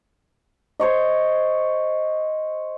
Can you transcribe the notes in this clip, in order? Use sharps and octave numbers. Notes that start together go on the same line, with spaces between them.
C5 C#5 D#5